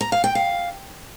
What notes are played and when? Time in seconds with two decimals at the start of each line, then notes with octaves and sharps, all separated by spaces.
0.01 A#5
0.12 F5
0.24 G5
0.35 F5